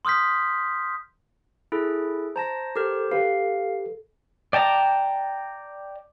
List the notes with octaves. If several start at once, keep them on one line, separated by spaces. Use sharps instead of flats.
C6 D#6 F6 G6 B6
E4 G#4 A4
C5 A5 A#5 A#6
G4 A4 A#4 C5
G4 B4 F5
D5 G5 A5 A#5